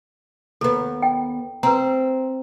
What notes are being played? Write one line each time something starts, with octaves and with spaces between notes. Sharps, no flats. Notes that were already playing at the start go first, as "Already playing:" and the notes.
D#2 B3 A4
G5
C4 B4 A#5